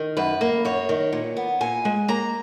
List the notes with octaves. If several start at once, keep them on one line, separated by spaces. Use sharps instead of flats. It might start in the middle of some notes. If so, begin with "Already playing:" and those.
Already playing: D#3
F#2 B4
A#3
F#2 C#5
D#3
A#2
B3
A#2 G#5
G#3
A#3 A#5